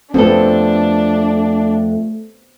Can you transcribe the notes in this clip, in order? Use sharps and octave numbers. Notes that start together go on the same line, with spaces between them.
F2 A3 B3 C4 D4 A4